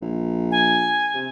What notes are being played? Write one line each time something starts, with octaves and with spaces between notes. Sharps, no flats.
A#1
G#5
C3